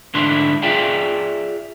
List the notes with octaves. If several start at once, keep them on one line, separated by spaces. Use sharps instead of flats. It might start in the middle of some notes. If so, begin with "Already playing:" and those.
D2 G#2 D3 D4 E4 C6
F4 G#4 D5 E5 F5 G5